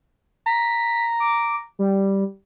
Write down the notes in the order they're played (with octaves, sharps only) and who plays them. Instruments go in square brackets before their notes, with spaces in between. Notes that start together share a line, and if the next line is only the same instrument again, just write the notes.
[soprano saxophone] A#5 [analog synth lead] B6
[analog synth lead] D6
G3